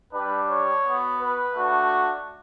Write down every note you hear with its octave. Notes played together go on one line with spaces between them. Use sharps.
G3 D4 G4 B4
C#5
B3 F#4
B4
A3 D4 F#4